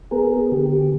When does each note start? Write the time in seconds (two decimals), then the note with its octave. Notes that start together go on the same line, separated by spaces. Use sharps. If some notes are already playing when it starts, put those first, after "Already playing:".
0.11 B3 G#4 A#4
0.32 G#4
0.52 D3 G4
0.72 G4